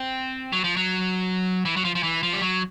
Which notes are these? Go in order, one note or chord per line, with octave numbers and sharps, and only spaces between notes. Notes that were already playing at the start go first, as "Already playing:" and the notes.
Already playing: C4
F#3
F3
F#3
E3
F#3
F3
F3
E3
F3
G3
F#3